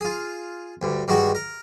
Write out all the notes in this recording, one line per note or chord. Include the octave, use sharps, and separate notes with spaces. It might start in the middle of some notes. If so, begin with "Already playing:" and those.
F4 G#4
D2 G2
G2 D#3 G#3 F#4 C#6
A#4